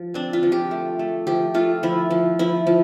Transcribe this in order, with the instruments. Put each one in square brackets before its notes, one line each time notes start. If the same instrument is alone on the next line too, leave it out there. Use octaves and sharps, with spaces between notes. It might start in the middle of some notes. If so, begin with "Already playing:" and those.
Already playing: [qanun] F3
C4 D4
F4
F3
G4
A3
A3
F3 G4
A3 F4
F3 E4
F3
F3 E4
F3